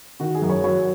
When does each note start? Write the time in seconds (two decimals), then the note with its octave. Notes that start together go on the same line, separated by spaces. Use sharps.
0.20 D#3 F#4
0.35 G#4
0.42 F#2
0.50 C#5
0.64 F#3 C#5